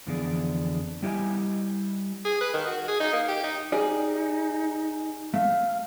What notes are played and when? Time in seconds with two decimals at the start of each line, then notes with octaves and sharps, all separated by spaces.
0.07 F2 D3 E3 B3 G#4 D5
1.02 G3 E4 G4 D#5 G#5
2.25 G#4
2.41 B4
2.54 D#3
2.67 F#4
2.88 G#4
3.00 D#4
3.13 A#3
3.28 G4
3.44 D#4
3.72 D#4 G4 G#4 D5
5.34 A3 F5